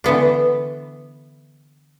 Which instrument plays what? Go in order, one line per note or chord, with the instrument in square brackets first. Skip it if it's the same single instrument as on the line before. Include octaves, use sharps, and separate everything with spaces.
[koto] D3 E3 B3 D4